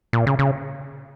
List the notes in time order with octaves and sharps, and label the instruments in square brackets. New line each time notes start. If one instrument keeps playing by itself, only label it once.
[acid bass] A#2
C#3
C#3